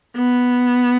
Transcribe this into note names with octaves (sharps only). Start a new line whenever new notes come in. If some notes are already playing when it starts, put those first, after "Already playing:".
B3